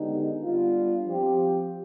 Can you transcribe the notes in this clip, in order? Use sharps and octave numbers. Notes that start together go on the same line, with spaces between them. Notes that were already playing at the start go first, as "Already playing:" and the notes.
Already playing: D3 G#3 B3 D#4 G4
G3 B3 D4 F4
F3 C4 G4